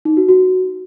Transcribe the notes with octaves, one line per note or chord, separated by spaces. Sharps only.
D#4
F#4
F#4